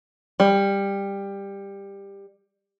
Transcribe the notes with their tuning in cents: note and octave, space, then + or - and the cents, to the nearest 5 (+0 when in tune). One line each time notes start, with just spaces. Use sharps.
G3 +15